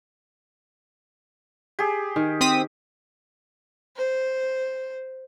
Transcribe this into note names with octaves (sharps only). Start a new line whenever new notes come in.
G4 G#4
D#3
C4 D#6 B6
C5